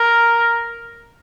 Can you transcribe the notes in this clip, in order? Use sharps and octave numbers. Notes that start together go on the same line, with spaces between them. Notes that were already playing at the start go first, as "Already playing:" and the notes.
Already playing: A#4